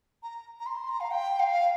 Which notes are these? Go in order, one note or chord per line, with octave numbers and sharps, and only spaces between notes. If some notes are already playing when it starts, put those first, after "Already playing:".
A#5
A#5
C6
A#5
F5
G5
F5